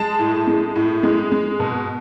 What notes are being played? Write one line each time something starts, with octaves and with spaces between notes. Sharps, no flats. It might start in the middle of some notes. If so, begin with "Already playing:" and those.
Already playing: G#3 A5
A2
G#3
A2
G#3
G#3
B2